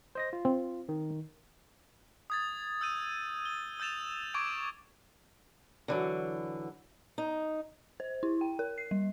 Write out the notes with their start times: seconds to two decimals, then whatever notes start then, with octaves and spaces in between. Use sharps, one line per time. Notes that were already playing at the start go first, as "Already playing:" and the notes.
0.15 C5 D#5 A#6
0.33 F4
0.45 C4
0.89 D#3
2.30 D#6 G#6 A6
2.81 E6 G6 D#7
3.46 G7
3.80 E6 G6 A6 E7 F7
4.34 C#6 D6 G#6 D7
5.88 D3 E3 F#3
7.18 D#4
8.00 C5
8.23 E4
8.41 G5
8.59 A#4
8.78 C7
8.91 G3